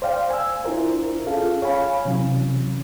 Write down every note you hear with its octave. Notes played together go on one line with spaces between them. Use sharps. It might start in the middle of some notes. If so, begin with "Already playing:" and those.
C5 D5 F5 G5
G#5 E6
D4 E4 F4 A#4 C5
C#4 F4 G#4 A4 F5
C#5 F5 G#5 B5
C3 E3 F#3 C#4